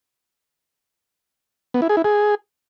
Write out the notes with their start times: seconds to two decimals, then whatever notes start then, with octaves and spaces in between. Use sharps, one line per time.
1.74 B3
1.82 E4
1.89 G#4
1.97 E4
2.04 G#4